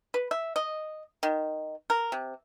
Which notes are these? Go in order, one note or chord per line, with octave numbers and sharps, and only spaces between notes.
B4
E5
D#5
D#3
A#4
C3